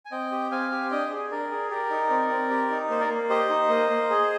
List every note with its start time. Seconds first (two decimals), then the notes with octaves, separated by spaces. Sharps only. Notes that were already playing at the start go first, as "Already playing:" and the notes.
0.05 G#5
0.12 C4 D#5 G5
0.32 G4
0.51 C4 F5 G#5
0.72 G4
0.91 D4 D#5 G5
1.10 G#4
1.31 D4 A#4 D5
1.51 G#4
1.70 G4 A#4 D5
1.91 D#4
2.10 C4
2.31 C4
2.50 G4
2.70 D#4
2.90 A#3 C5
3.00 A#4 D5
3.09 A#3
3.30 G4 C5 D#5
3.49 D#4
3.69 A#3
3.90 A#3
4.10 G#4